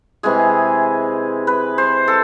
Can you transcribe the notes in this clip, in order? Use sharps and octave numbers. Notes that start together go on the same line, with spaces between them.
C3 E3 G#3 G#4
B4
C5
A4